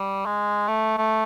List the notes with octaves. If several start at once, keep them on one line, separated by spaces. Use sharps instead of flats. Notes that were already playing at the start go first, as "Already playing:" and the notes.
Already playing: G3
G#3
A3
A3